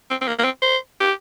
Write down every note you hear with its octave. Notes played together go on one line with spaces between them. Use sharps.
C4
C4
A#3
A#3
C4
C5
G4